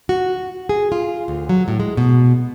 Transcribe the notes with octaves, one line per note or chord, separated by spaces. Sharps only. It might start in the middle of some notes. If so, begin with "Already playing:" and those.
F#4
G#4
F4
D2
F#3
A2
G#3
B2